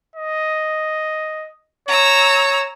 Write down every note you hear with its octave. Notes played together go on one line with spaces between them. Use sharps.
D#5
C#5 A#5 E6